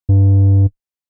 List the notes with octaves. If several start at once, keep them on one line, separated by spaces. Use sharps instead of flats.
G2